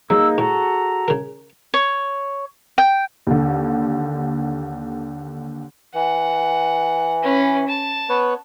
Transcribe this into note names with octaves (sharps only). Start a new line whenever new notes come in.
F#3 A#3 D#4 G#4 E6
A2 F#4 A4 A#5
C#3 A#4
C#5
G5
D#2 D3
E3 F#5
C#4 B4
A5
B3 B4 C#5